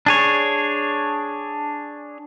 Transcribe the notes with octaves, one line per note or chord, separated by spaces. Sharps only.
D4 G#4 C#5